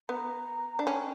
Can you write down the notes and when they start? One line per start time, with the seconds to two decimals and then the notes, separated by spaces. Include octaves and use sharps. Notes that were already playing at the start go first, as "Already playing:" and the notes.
0.09 B3 A#5
0.79 D4
0.87 C#4 G5